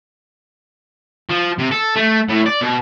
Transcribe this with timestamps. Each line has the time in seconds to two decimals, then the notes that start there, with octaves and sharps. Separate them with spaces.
1.30 F3
1.59 C3
1.72 A4
1.96 A3
2.29 A2
2.46 D5
2.61 B2